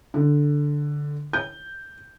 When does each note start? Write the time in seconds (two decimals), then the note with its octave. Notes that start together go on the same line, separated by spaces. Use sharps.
0.14 D3
1.33 G6